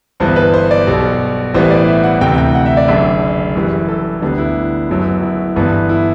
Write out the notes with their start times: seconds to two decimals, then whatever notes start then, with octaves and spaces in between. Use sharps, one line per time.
0.20 G1 G2 E3 B3 C5
0.36 B4
0.54 C5
0.71 D5
0.87 B1 B2 G3
1.54 A1 A2 E3 G3 B3 C5
1.71 D5
1.88 E5
2.04 F#5
2.21 D2 C3 E3 G5
2.38 G5
2.55 F#5
2.66 E5
2.77 D5
2.88 F#1 F#2 D3 E5
3.55 F#2 E3 G3
3.88 A4
4.21 D2 D3 G3 B3 D4
4.38 E4
4.88 F#1 F#2 F#3 B3
5.23 E4
5.56 G1 G2 E3 B3
5.89 E4